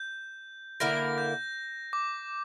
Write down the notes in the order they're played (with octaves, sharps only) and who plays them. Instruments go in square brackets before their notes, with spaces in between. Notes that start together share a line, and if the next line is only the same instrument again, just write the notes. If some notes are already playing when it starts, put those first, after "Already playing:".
Already playing: [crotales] G6
[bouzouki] D3 A#3 E4 A#4 [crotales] A#6
[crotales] G6
D6